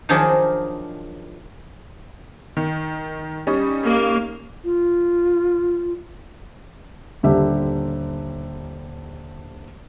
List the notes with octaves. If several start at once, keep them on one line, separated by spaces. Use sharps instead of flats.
D#3 F3 F#3 D4 D#4 G#4
D#3
G3 C#4 D#4
A#3
F4
D#1 D3 G4 E5